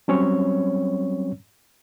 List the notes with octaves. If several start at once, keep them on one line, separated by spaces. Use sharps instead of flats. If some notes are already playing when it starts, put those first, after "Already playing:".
F#3 G3 C4 C#4 C#5